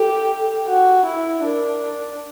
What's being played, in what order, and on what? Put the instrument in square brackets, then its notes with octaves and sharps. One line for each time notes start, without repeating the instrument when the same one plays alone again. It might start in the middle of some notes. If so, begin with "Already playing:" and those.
Already playing: [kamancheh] G4 [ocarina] A4
[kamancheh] F#4
E4
[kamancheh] D4 [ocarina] A#4